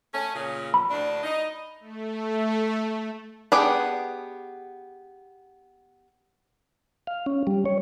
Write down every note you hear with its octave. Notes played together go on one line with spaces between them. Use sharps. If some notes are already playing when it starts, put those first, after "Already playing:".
A3 C#4
A#2 C#3
B5
D2 A2 D4
D#4
A3
B3 D4 G4 G#4
F5
C#4
G3
C#5